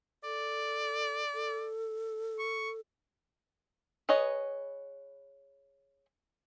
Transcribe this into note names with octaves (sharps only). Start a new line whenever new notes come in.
A4 D5
A4
C#6
G#4 B4 C#5 D#5